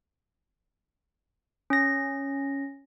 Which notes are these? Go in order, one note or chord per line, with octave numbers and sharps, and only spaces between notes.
C#4 A#6